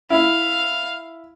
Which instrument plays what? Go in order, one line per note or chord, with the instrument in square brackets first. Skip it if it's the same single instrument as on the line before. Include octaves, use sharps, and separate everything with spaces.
[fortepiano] E4 [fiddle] F5